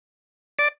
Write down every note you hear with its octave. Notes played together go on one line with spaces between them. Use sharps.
D5